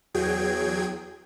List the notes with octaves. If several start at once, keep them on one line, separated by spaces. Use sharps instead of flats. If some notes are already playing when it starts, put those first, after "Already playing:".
E2 F#3 G#4 G5 G#6